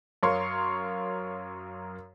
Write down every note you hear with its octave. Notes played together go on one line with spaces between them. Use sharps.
F#2 A#4 C#5 F5 C6 C#6